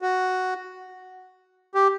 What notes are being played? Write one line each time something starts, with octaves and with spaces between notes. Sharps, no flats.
F#4
G4